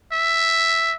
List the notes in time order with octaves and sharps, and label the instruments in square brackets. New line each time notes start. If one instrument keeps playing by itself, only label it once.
[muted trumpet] E5